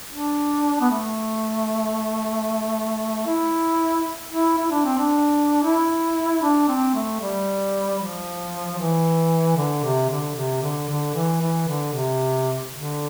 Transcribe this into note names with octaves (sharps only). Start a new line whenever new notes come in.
D4
B3
A3
E4
E4
E4
D4
C4
D4
E4
D4
C4
A3
G3
F3
E3
D3
C3
D3
C3
D3
D3
E3
E3
D3
C3
D3